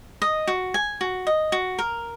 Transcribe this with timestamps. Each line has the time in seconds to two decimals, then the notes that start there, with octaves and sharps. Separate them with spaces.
0.22 D#5
0.47 F#4
0.74 G#5
1.01 F#4
1.27 D#5
1.52 F#4
1.79 A#4